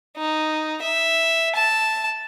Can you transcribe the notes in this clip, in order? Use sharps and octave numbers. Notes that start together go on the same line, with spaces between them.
D#4
E5
A5